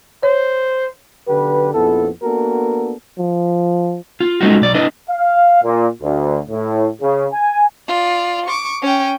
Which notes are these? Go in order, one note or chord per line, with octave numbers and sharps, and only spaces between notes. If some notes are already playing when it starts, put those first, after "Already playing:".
C5 C#5
B1 D3 G4 B4
A#1 F2 B3 E4 A4
A#3 B3 D4 F#4 A4 A#4
F3
F4
G#3 A3 C#4 D#4 F4 F#4
B1 D5
D4 E4 B4 D#5
F5
A#2
D2
A2
C#3
G#5
F4 D5
C#6 D6
C#4 G5